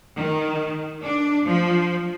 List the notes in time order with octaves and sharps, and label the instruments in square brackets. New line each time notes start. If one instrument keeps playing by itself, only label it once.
[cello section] D#3
D4
F3